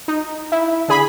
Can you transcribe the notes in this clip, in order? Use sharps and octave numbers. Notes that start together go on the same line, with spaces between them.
D#4
E4
D3 G#4 B5